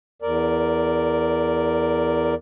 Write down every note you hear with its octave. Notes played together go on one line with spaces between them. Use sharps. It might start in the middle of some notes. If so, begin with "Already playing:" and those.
E2 A#4 D5